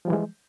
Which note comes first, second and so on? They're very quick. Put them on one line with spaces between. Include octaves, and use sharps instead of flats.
F3 G3 E3 G#3